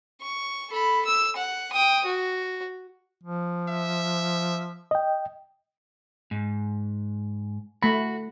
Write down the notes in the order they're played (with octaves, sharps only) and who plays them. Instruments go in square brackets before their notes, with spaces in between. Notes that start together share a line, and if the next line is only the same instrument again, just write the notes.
[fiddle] C#6
A4 B5
E6
F#5
G5 D#6
F#4
[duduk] F3
[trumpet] E5
[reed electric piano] D#5 G5
[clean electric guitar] G#2
[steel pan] A3 B5 [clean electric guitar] F#4